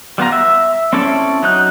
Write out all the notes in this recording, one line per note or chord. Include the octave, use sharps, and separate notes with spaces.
G3 B3 F4 A#5
E5
C4 C#4 E4 A4 D5
F#3 D#4 F#6